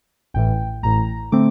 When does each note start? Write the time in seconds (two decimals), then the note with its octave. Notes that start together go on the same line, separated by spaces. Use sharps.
0.34 A1 A2 E3 G5
0.83 A1 A2 E3 A#5
1.32 D3 A3 C4 D6